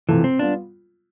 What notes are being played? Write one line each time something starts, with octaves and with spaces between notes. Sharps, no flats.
C3 E3 F3 A3
C4
G3 B3 D4 F4